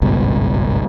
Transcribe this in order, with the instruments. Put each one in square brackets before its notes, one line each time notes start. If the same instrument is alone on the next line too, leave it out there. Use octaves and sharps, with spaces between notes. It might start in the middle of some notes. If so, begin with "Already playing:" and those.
[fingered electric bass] G#1 C#2 G2 B2